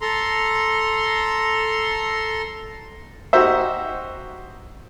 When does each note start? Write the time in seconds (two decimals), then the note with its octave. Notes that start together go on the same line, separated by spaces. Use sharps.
0.01 A4 A#5 C6
3.33 D#4 F#4 G4 C5 E5